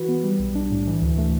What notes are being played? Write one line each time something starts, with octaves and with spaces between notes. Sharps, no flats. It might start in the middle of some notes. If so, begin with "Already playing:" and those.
Already playing: E3 F#4 B4
B3
G3
B1
D4
A2
E3
D2
A3